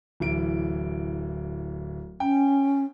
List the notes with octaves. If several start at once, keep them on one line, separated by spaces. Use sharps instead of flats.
D1 E3 D7
C#4 G5